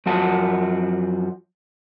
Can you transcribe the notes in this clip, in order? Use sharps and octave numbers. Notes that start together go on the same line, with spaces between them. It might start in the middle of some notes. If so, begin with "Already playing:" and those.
F#2 F3 F#4 A5